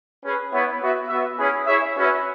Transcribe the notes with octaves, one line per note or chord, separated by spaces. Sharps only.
C#4 G#4 B4
B3 E4 C#5 E5
B3 F#4 E5
B3 F#4 E5
C#4 E4 G#4 B4
E4 G#4 C#5 E5
C#4 F#4 B4 E5